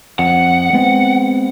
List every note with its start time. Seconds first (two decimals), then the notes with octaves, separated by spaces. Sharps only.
0.19 F2 F#5
0.73 G#3 B3 C4